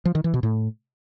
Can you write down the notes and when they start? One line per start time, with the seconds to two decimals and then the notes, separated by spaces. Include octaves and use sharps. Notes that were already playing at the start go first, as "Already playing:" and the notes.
0.05 F3
0.15 D#3
0.24 E3
0.34 B2
0.43 A2